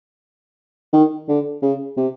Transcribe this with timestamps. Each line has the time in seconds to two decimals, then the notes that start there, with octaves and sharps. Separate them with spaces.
0.93 D#3
1.28 D3
1.62 C#3
1.97 C3